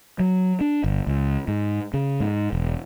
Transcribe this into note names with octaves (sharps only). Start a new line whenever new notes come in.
F#3
D4
G1
C#2
G#2
C#3
G#2
E1